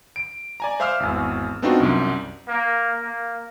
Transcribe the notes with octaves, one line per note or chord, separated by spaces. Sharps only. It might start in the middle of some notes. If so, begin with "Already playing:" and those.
D7
D5 G#5 A#5
C5 E5 F5 D6 E6 F6
G#1 E2
B3 C4 D4 D#4 F4 F#4
C2 F#2
A#3
A#3